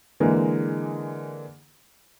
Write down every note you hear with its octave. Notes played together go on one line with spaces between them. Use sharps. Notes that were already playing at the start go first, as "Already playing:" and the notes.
D3 E3 G#3 A#3 G#4